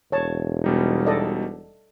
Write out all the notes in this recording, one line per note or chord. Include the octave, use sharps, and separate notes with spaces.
E1 C#5 A5
B2 G3 D#4
A4 D5 D#5